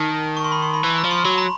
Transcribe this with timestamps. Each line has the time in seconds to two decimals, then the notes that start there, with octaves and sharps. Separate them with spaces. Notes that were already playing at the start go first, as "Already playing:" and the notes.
Already playing: D#3 A5
0.37 C#6
0.44 C6
0.52 B5
0.62 C6
0.74 B5
0.84 E3 B5
0.98 A#5
1.04 F3
1.11 C6
1.24 F#3 B5
1.38 A#5